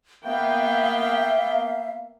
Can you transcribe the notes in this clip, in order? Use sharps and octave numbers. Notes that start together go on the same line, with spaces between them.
A#3 B3 E5 F5 G5